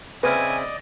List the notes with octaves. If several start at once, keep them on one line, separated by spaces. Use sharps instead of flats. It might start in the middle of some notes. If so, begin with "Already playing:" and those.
C#3 C4 E4 B4 D5 D#5 G#5 F6